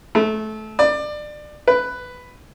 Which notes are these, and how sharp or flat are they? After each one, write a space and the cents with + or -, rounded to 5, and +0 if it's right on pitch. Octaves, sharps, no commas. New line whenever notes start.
A3 -20
D5 +25
B4 +5